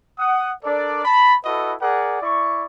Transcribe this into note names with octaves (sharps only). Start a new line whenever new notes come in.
F#5 D#6
D4 A4 A#4 D5
A5 B5
E4 F#4 A4 B4 D#5
G#4 A#4 D5 F#5
E4 D5 C#6